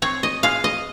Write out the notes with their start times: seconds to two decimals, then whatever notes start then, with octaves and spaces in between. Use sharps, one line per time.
0.02 C4 C#5
0.23 D#5
0.43 G#3 F5
0.64 D#5